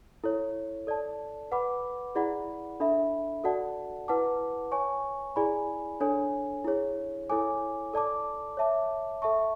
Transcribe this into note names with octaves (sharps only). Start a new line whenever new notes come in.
E4 A4 C#5
A4 D5 A5
B4 F#5 B5 D6
E4 G#4 D5 F#5 B5
D4 A4 E5 B5
F#4 A4 D5 F#5 A5
E4 B4 F#5 A5 D6
C#5 G#5 C#6
E4 G#4 D5 G#5 B5
D4 A4 C#5 G#5
E4 G#4 C#5
E4 A4 C#5 G#5 D6
A4 D5 A5 D6
C#5 E5 A5 D6
A4 E5 A5 C#6